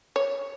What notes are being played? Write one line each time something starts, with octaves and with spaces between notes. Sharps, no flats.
C#5